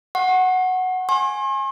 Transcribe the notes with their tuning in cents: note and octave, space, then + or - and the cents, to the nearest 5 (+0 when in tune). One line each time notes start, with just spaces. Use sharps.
F#5 +0 C#6 -30
G#5 +0 C6 +45